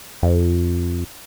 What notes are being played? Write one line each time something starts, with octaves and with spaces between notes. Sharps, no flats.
F2